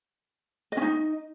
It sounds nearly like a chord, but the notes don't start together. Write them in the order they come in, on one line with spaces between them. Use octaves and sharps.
D#5 C#4 D#4